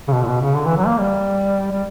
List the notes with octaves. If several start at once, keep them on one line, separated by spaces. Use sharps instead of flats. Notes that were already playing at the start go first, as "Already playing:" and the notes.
C#3
B2
A#2
B2
C#3
D3
E3
F#3
A#3
G3
G3